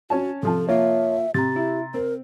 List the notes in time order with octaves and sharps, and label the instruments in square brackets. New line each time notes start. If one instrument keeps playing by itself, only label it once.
[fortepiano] C#4 C#5 A5 [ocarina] F#4
[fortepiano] C3 F3 A5 [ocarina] A4
[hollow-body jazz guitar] A#3 F4 [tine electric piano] C#5 [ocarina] E5
[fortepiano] C3 [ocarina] G4 [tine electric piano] A#5 A6
[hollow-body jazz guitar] E4
[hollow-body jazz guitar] C4 [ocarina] A#4